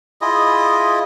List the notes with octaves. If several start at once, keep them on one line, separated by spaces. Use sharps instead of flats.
E4 F4 G#4 D#5